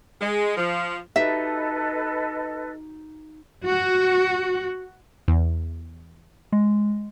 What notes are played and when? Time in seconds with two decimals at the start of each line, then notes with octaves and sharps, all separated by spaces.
0.21 G#3
0.57 F3
1.16 D#4 F#4 G4 A4 B4 D#5 E5
3.65 F#4
5.28 E2
6.52 G#3